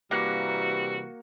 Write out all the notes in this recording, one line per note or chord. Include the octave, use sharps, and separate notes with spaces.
C3 E3 G3 A#3 F#4 F#6